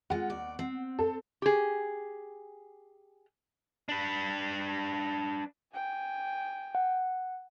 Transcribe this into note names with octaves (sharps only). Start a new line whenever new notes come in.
G#3 F4 F#5
D#2 D5
C4
A4
G4 G#4
D4 B4
G5 G#5
F#5